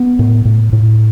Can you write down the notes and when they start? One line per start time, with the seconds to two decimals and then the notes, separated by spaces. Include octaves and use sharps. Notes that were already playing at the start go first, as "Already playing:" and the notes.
Already playing: B3
0.19 A2
0.45 A2
0.73 A2